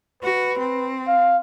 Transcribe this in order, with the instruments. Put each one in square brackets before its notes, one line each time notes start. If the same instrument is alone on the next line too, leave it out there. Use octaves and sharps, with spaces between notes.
[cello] F#4 [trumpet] B4
[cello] C4
[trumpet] F5